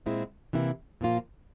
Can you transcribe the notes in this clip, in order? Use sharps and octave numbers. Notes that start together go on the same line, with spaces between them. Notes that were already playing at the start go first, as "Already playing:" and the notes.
A#2 G#3 C4 E4
C3 E3 A#3 E4
A#2 F3 A#3 F4